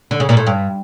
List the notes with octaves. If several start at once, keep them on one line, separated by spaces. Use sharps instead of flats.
D3
C#3
A#2
A2
G2